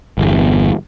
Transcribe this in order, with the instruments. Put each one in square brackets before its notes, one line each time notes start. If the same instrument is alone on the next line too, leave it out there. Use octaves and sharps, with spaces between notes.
[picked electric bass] G1 E2